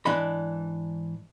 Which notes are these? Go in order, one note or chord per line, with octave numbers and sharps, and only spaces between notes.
G#2 E3 D4 D#5 B5